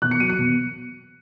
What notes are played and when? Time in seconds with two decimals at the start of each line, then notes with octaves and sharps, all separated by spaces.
0.02 B2 F#6
0.11 C#7
0.20 F#3 D#7
0.30 C#7
0.39 B2